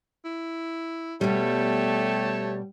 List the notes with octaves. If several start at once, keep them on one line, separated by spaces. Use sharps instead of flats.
E4
B2 G3 A3 G4 C#5 A5